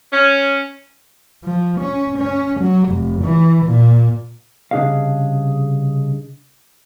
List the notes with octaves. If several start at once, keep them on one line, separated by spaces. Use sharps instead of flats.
C#4
F3
C#4
C#4
F#3
F1
E3
A#2
C2 C#3 D4 G#4 D#5 F5